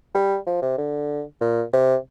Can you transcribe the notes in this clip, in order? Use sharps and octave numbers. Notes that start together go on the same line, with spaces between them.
G3
F3
C3
D3
A#2
C3